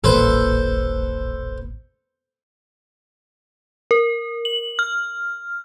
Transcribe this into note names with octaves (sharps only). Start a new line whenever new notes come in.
D#1 A1 A#2 A4 B4 C5
A#4
F#7
F6